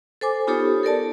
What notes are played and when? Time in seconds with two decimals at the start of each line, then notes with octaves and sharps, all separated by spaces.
0.21 A4 C5 G#5 D6
0.47 B3 D#4 F4 G4 A4 C#5
0.83 A4 A#4 D5 A5